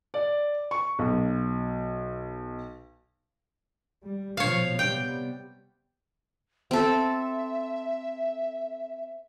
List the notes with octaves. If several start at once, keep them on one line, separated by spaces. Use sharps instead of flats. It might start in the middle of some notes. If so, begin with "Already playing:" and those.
D5
C#6
B1
G3
A#1 B2 F3 C#5 F5
C3 G3 B3 G5
C4 A4 E5